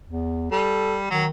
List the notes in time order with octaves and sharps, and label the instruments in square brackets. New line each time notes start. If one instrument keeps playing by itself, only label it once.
[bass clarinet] E2
[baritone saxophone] G3 [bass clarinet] A4
[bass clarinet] D#3 [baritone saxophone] F#3